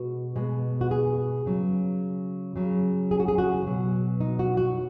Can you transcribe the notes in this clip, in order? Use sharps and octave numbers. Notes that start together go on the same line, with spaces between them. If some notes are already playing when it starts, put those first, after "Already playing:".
Already playing: B2 G#3 F#4
B2 G#3
F#4
G#4
C#3 F#3
C#3 F#3
G#4
F#4
G#4
F#4
B2 F#3
D#4
F#4
F#4